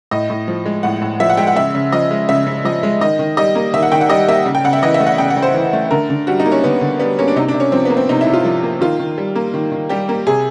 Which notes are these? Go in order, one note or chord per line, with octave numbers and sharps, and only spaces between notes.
A2 D#5
A2
F3
G#3
A2 F#5
A2
F3 E5
F#5
G#3 G5
F#5
C#3 E5
C#3
F3 D#5
G#3
C#3 E5
C#3
F3 D#5
G#3
D#3 D#5
D#3
G3 D#5
A#3
D#3 E5
F#5
D#3 G5
F#5
G3 D#5
A#3 E5
C#3
G5
C#3 F#5
E5
E3 D#5
E5
A3
F#5
C#3 G5
F#5
C#3
C5
E3
A3
D3 A#4
D3
G3 F#4
D#4
A#3
C#4
D3 B3
D3
G3 B3
A#3 C#4
D4
C3 D#4
D4
C3
C#4
F3 C4
B3
A#3
C4
C3 D#4
E4
C3
F4
F3
A#3
D#3 F4
D#3
G3
A#3
D#3
D#3
G3 G4
A#3
C3 G#4